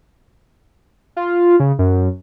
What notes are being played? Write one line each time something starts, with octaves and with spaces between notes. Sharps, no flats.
F4
C#3
F#2